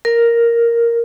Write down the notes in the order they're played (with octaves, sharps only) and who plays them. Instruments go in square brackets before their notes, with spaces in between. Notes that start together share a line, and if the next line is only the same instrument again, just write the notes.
[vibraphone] A#4